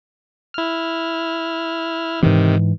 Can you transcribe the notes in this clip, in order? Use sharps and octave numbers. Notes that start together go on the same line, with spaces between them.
E4 F6
G#2 C3 D#3 E3